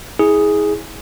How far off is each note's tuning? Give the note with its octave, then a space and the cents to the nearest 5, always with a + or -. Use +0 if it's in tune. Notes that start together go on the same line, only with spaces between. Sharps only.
E4 -35 G#4 +0